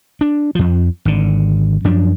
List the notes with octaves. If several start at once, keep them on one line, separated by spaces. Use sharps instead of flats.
D4
F2 F3
G#1 D3
F#2 F3 D4